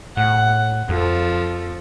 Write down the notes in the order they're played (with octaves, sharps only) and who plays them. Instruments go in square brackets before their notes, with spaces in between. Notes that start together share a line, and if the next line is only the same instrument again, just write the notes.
[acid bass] A2 [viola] F#5
[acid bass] F2 [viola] F3 A4